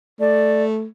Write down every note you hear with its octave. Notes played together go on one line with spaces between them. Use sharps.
A3 D5